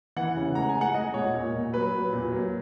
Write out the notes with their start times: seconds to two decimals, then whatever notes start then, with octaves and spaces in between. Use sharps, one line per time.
0.16 E3 F#5
0.37 C#3
0.55 G#3 A#5
0.69 G#5
0.75 G#3
0.81 F#5
0.94 G#3 D#5
1.14 A#2 C#5
1.34 A#2
1.53 A#2
1.73 F#3 B4
1.93 F#3
2.13 A#2
2.32 F#3